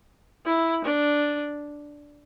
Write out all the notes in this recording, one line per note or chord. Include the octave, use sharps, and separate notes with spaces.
E4
D4